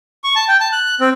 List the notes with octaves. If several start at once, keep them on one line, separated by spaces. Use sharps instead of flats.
C#6
A5
G5
A5
F#6
C4